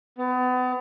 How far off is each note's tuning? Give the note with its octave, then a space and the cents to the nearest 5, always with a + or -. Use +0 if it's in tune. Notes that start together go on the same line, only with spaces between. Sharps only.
B3 +35